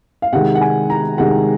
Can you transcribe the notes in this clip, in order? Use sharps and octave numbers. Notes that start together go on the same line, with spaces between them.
F5
C3 D#3 G#3 F#5
F#5
G#5
A#5
C3 D#3 G#3 F#5